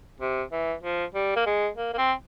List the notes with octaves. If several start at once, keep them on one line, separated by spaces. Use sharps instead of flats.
C3
E3
F3
G3
A#3
G#3
A#3
A#3
C4